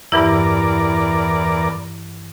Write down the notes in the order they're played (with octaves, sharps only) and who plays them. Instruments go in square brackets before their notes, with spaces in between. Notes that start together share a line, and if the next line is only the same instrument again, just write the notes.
[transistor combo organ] E2 A#4 D5 [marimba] G2 E3 E4